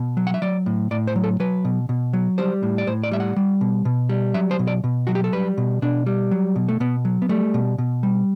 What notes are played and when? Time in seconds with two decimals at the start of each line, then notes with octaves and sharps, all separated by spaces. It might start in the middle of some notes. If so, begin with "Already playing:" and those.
Already playing: B2
0.17 F#3
0.27 F#5
0.34 E5
0.42 F#3 D5
0.66 A2
0.91 A2 D5
1.07 C5
1.16 F#3
1.24 A4
1.40 F#3 B4
1.65 B2
1.89 B2
2.13 F#3
2.38 G3 C5
2.63 A2
2.78 D5
2.87 A2 C5
3.03 D5
3.11 G3 E5
3.20 F#5
3.36 G3
3.61 B2
3.85 B2
4.09 G3
4.34 F#3 E5
4.51 C5
4.59 B2
4.67 D5
4.84 B2
5.07 F#3 F#4
5.15 G4
5.24 A4
5.33 G3 B4
5.58 B2
5.82 B2 D4
6.06 G3
6.31 F#3
6.56 B2
6.68 A3
6.80 B2 B3
7.05 F#3
7.22 B3
7.29 G3 A3
7.54 B2
7.78 B2
8.03 G3